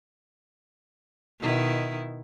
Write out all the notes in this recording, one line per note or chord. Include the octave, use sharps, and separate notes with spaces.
B2 D#3 E4